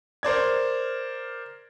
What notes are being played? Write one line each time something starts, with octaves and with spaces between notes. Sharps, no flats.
A#4 C5 D5 G#6